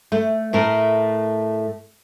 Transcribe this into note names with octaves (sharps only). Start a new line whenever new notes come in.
A3
A2 A3 A#4